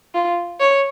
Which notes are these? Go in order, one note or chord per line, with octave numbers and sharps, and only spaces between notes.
F4
C#5